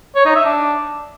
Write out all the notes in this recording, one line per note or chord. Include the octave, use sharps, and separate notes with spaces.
C#5
D#4
E5
D4